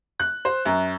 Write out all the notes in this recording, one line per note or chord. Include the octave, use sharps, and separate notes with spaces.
F#6
C5
F#2